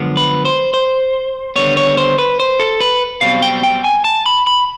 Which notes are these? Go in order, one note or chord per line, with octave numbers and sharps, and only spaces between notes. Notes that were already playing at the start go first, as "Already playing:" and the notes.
Already playing: F#2 D3 F3 G#3 B3
B4
C5
C5
D#2 D3 G3 B3 C#5
C#5
C5
B4
C5
A4
B4
B1 B2 G3 C4 F5
G5
G5
G#5
A5
B5
B5